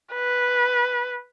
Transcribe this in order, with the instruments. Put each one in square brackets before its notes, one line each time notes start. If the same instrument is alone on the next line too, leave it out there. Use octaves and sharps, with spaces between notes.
[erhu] B4